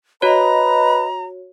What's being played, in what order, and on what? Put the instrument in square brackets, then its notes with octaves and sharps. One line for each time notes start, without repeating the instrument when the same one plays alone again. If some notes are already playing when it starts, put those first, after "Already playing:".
[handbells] F#4 C#5 [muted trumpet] B4 [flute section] D#5 [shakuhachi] A#5